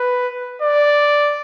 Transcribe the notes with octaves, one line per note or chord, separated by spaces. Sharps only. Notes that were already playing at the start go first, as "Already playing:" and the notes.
Already playing: B4
D5